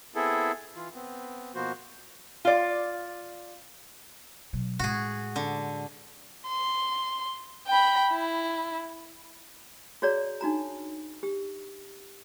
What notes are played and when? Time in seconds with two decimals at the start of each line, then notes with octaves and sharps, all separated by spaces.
0.15 B3 C4 E4 G#4 A4
0.76 E3 F4
0.94 B3 C4
1.55 B2 F3 A#3 B3 F#4 C5
2.45 F4 D5
4.53 B2 F#3
4.79 A2 G#3 F#4 G#4
5.36 D3
6.48 C6
7.67 G5 B5
8.10 E4
10.02 F#4 G#4 C#5 D5 A#5
10.41 D4 D#4 F#4 A#5
11.23 G4